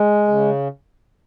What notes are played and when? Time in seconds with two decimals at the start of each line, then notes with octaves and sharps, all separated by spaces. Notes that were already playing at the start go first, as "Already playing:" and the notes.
Already playing: G#3
0.28 C#3